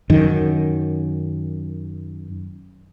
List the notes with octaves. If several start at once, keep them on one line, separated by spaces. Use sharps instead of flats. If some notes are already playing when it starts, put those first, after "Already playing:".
F#2 D#3